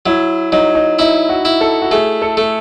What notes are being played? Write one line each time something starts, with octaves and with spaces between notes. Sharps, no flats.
F#3 E4
F#3 D#4
D#4
D#4 E4
F#4
E4
A4
F#4
A3 G#4
A4
A3